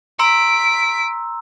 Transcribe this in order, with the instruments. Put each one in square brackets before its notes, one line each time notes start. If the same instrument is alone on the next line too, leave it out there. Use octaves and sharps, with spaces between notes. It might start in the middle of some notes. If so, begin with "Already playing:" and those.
[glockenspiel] A#5 C6 E6 [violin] B6 D7